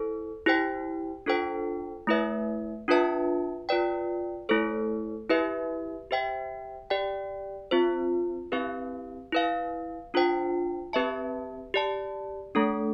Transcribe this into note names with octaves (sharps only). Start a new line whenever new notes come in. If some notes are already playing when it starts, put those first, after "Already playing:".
Already playing: E4 A4 C5
E4 G4 C5 G5
D4 F4 A4 C5 G5
A3 E4 B4 E5
D4 F4 B4 E5 A5
F4 B4 D5 G5
A3 E4 A4 C5
E4 G4 B4 E5
G4 C5 E5 G5
G4 D5 G5
C4 F4 C5
C4 E4 G4 B4 F5
E4 B4 F5
D4 F4 C5 G5
C4 G4 B4 E5 A5
G4 D5 A5
A3 D4 A4